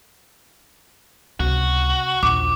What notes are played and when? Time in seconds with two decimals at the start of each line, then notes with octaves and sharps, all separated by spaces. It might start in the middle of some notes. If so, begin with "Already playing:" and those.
1.40 C#2 C3 F#4
2.23 A#1 D#2 D6